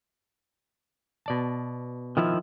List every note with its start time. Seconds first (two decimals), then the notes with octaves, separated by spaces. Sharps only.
1.26 B2 D5 A5
2.17 D#3 F3 E4